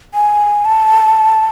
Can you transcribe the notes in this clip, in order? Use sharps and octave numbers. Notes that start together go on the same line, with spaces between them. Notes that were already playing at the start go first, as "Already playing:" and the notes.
G#5
A5